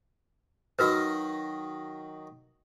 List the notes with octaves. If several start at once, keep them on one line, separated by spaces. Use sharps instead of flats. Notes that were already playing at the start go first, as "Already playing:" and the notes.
D#3 F#3 F#4 A#4 B4 D#5